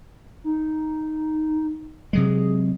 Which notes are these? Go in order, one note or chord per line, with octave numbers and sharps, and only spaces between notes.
D#4
C3 F#3 G#3 G#4